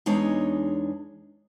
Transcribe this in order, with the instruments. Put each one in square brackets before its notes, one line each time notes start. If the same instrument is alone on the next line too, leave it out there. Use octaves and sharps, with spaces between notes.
[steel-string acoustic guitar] E2 G#3 D4 D#4 C#5